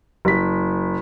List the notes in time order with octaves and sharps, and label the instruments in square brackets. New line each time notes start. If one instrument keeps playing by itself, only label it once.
[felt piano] F#1 B6